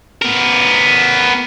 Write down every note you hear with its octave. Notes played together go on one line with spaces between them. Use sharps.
B3 A#4